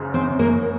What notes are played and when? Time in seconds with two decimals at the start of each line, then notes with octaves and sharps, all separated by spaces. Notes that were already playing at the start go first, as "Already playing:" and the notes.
Already playing: F#1 F#2 C#3
0.14 C4 C5
0.39 A#3 A#4